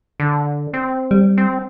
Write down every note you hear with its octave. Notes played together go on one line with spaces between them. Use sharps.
D3
C4
G3
C4